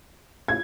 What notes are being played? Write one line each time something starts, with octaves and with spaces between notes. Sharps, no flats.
G#6